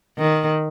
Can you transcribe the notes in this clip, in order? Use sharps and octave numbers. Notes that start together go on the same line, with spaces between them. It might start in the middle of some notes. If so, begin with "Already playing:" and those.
D#3